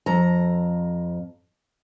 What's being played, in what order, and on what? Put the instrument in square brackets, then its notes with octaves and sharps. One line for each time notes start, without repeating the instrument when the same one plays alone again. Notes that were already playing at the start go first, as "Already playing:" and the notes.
[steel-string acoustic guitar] F2 A#5